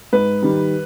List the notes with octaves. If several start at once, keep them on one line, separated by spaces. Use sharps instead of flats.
G#2 B4
D#3 G3